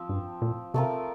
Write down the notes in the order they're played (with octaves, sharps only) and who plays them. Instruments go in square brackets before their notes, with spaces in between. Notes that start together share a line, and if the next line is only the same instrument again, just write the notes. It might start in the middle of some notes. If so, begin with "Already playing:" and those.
Already playing: [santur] F3 C4
[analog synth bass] G2
A#2
[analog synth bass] C3 [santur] A3 C4 F4 A#4